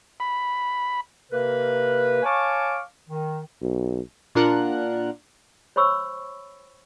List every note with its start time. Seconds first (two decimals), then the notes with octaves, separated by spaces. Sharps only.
0.20 B5
1.31 C3 A#3 A#4 B4
2.23 C#5 F5 G#5 A5 C#6 D6
3.09 D#3
3.62 B1
4.35 A#2 D4 F4 A#4 F#5 F#6
5.76 C5 C#5 B5 C#6 E6